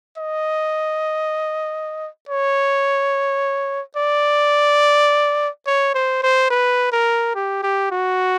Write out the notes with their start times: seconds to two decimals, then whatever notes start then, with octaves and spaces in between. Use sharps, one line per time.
0.18 D#5
2.29 C#5
3.97 D5
5.67 C#5
5.94 C5
6.23 C5
6.51 B4
6.92 A#4
7.35 G4
7.63 G4
7.91 F#4